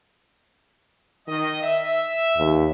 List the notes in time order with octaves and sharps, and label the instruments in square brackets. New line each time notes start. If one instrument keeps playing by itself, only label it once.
[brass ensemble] D#3 D#5
E5
[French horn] D#2